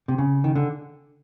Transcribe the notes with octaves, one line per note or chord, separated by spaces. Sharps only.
C3
C#3
D#3
D3